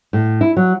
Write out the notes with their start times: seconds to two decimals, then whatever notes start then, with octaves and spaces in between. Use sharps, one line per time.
0.13 A2
0.41 E4
0.57 F#3